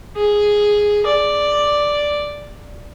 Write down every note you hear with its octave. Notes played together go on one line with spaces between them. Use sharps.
G#4
D5